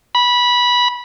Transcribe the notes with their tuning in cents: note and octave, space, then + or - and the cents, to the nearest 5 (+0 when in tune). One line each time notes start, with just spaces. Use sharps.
B5 -15